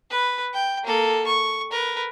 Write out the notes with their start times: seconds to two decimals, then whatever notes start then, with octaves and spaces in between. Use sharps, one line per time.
0.11 B4
0.54 G5
0.84 A#3 A4
1.27 C#6
1.71 A#4 B4